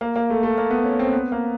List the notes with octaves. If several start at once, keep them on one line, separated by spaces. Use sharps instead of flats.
A#3
A#3
A3
A3
A#3
B3
C#4
C4
B3
A#3